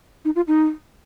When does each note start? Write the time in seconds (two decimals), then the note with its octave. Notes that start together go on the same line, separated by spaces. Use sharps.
0.25 D#4
0.36 F4
0.48 D#4